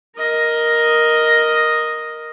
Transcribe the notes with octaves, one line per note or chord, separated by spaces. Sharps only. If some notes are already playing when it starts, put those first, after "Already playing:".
A#4 D#5